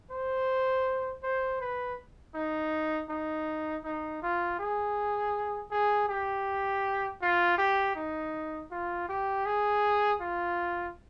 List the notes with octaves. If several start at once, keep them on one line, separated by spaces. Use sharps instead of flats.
C5
C5
B4
D#4
D#4
D#4
F4
G#4
G#4
G4
F4
G4
D#4
F4
G4
G#4
F4